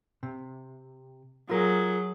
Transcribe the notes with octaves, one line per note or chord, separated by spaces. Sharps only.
C3
F#3 F4 G#4 A#4